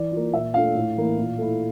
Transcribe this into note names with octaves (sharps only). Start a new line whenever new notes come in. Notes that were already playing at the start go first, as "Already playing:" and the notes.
Already playing: E3 D5
A#3 F4
A#2 E5
A3 D4 F4 F5
A2
E3 A#3 E4
A#2
A3 E4